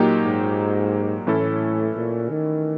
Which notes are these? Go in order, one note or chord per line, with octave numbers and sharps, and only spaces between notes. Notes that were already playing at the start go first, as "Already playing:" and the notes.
Already playing: A#2 F#3 A#3 D#4 G4
G#2
A2 E3 A3 C#4 E4 A4
A#2
D#3